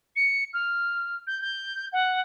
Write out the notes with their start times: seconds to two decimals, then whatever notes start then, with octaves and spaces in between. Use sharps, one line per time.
0.15 C#7
0.53 F6
1.27 G6
1.41 G6
1.92 F#5